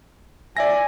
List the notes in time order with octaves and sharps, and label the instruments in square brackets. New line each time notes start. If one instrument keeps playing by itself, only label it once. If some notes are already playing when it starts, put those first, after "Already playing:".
[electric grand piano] D5 E5 A#6 [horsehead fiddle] G#5